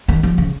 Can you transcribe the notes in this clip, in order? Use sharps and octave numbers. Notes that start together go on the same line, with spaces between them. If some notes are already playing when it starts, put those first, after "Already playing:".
D#3
F3
C#3